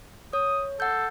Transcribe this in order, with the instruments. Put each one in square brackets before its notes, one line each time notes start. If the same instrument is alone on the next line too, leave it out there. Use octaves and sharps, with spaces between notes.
[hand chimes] C#5 [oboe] D#6
[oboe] A4 [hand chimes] F#5 G6